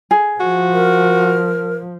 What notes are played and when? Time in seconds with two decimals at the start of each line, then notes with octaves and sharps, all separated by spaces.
0.11 G#4
0.40 F3 F#4
0.73 A#4